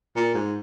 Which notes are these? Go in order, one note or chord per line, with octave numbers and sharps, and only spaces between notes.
A#2
G#2